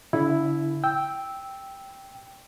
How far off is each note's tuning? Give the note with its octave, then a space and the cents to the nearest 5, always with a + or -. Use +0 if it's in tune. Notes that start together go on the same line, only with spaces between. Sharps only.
D3 -45 E4 +0
G5 +0 E6 -10